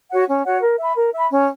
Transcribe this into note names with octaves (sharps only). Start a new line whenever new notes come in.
F#4 C#5 F#5
C#4
F#4 C#5 F#5
A#4
E5 B5
A#4
E5 B5
C#4